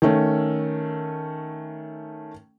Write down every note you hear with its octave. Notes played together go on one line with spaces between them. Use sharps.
D#3 A3 C#4